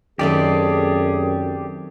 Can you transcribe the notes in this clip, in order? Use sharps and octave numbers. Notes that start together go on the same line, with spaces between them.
F#2 D#3 A3 C4 G4 G#4 D5